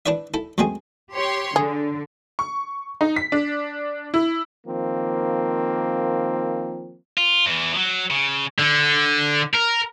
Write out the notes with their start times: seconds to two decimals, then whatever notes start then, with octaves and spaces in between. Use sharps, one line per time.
0.06 D4 E4 B4 D5 E5
0.34 E4 A4
0.58 F#2 G#3 A3 C4 G#4
1.14 G4 C#5 C6
1.56 D3 G#4
2.39 C#6
3.01 D#4
3.16 B6
3.32 D4
4.14 E4
4.67 D#3 F3 A#3 C4
7.17 F4
7.46 E2 E3
7.73 F3 F#3
8.11 C#3
8.59 D3
9.55 A#4